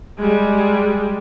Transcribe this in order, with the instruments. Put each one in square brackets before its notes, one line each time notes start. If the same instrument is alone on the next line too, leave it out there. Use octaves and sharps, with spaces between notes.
[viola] G3 G#3